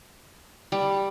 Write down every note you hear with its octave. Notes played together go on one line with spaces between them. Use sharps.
G3